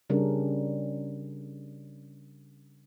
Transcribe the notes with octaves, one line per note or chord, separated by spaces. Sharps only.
C#3 G3 C#4 D4 A#4